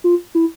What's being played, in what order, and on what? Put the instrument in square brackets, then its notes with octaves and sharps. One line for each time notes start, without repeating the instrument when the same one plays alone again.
[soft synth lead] F4
E4